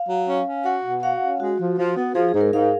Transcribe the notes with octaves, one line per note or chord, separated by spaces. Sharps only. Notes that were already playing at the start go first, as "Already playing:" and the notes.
Already playing: F5
F#3
C#4
C#4
F#4 F#5
B2
F#4 F5
C#4
G#3 F#4
F3
F3
B3
F3 G#4
G#4
G#2
A#4
G#2 F5